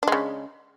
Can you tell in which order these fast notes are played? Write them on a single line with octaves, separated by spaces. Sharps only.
D4 G#3 C#3